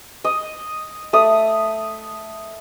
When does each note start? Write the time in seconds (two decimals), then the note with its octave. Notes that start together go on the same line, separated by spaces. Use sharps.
0.24 D#5
1.13 A3 D#6